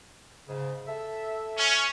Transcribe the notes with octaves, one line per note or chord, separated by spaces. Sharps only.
G#2 C#3
A4 E5
C#4